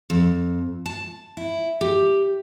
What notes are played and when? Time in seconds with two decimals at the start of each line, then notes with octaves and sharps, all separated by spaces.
0.10 F2
0.86 A5
1.37 E4
1.81 G4